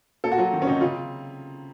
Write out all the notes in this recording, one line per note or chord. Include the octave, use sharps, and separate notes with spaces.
A#3 A4
F#4
F#3 F4
D#3
C#4
C3 D#4
C#3 F4